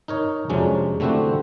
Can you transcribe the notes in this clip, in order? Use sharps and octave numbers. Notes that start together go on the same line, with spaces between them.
D#4 A#4 C#5
F2 C3 F#3 G#3 C#4 D4
D3 A3 C4 E4 F#4 G4